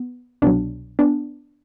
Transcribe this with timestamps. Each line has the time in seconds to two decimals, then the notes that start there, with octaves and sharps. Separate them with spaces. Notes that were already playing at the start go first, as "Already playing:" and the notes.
Already playing: B3
0.42 C2 B2 F#3 B3 D4
0.99 B3 D4